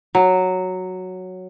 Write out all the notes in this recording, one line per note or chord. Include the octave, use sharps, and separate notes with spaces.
F#3